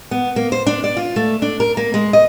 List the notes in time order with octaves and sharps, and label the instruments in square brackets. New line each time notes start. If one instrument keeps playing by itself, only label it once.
[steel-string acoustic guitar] B3
A#3
C5
D4
D5
F4
A3
D4
A#4
A#3
G#3
D#5